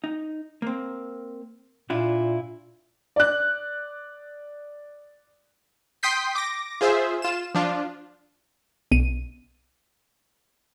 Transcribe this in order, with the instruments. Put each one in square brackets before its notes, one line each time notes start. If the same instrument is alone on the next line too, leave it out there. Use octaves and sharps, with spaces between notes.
[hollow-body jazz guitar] D#4
A#3 C4
[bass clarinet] A#2 [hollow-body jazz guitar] D4 E4 F4
[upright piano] D5 F#6
[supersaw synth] G5 C6 D#6 G6 B6 C7
D6 A#6
F4 G#4 C5 E5
F4 E7
F3 D4 F4
[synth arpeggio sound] B1 D#7